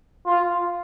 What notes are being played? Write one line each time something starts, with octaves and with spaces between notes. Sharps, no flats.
F4